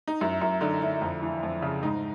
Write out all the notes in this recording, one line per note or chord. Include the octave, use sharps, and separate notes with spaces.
D#4
F#2 E4
F#2 E4
D3 D#4
D3 E4
F2
E3
F2
C#3
G#2 D#4